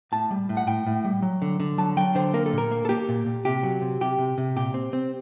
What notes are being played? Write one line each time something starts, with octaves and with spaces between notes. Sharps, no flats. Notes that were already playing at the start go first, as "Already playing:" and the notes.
A2 A5
G3
A2
F#5
A2 G5
A2
G3
F#3
D3
D3
F#3 A5
F#3 G5
D3 C5
A#3 A#4
A4
A#2
A#4
A#3
A4
A#3 G4
A#2
A#2
C3 G4
F#3
C3
C3 G4
C3
C3
A#2 G4
C4
C4